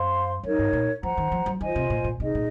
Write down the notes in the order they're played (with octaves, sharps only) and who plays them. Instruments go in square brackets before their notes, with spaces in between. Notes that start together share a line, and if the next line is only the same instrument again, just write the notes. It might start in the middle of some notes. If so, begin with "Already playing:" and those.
Already playing: [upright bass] F#2 [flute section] C5 F5 C6
[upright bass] F#2 [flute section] D#4 A#4 C#5
[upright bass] G#2
A#2
[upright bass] F3 [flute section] C5 F#5 A#5
[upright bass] D#3
F3
F#3
[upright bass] D#3 [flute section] F4 C5 D#5 G#5
[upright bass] C3
A#2
A#2
[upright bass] C3 [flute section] D#4 G#4 D#5
[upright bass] A#2